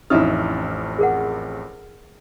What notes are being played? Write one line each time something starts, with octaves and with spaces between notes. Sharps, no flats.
A1 F2 C#4 D#4 E4 D#6 F6
G#4 A#4 F#5